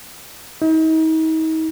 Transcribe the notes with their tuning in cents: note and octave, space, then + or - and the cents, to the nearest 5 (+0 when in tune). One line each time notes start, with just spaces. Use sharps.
D#4 +40